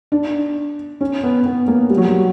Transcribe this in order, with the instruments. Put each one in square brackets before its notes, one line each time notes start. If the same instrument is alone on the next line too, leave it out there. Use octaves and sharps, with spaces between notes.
[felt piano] D4
C#4
B3
B3
A#3
G3
F#3
G3